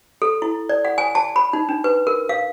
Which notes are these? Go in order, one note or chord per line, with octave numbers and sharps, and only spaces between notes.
A4
E4
D5
F#5
G#5
A5
B5
D#4
D4
B4
A#4
F5